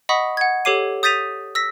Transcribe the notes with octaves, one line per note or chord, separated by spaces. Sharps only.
D#5 F#5 B5 C#6 D#6 B6
F#5 G#6
G4 A4 C#5 D6 C7 D#7
D#6 G6 A6 B6 D#7 F7
E6 A#6 B6